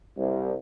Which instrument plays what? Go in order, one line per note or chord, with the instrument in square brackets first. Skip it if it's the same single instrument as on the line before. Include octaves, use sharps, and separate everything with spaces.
[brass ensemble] C2